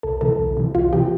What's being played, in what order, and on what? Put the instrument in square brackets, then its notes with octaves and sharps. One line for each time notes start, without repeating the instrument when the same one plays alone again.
[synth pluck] C2 A4
C3 E3 A4
C2
C3 E3
C2 F4
C3 E3 G4